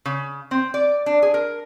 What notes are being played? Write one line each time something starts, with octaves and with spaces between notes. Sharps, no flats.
C#3
C4
D5
D4
G#4
A#4